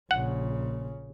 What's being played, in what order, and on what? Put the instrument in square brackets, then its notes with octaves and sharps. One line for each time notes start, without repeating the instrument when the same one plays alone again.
[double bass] A#1 C#3 [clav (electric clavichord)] F#5